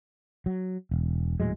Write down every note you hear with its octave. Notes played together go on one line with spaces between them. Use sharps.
F#3
E1
D#1 A2 F#3 G#3